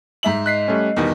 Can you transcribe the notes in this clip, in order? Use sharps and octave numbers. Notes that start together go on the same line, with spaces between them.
G#2 E5 F#7
D#5 F#6 B6 C7
G3 A3 C#4
E2 G2 B2 D#3 G3